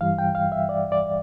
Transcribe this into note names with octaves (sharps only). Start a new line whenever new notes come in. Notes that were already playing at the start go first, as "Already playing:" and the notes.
G2 E3 G3 F5
G5
F5
E5
D5
D5